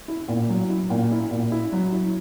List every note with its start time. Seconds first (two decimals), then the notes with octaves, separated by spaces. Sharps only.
0.08 E4
0.28 A#2
0.49 F#3
0.70 E4
0.90 A#2
1.11 E4
1.31 A#2
1.52 E4
1.72 F#3
1.92 E4